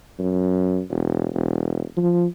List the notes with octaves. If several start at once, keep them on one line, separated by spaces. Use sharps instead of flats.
F#2
E1
E1
F3